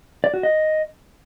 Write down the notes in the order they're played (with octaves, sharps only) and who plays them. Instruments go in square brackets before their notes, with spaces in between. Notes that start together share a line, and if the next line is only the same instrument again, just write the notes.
[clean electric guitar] D5
F#4
D#5